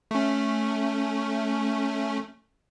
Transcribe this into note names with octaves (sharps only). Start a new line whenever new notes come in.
A3 C#4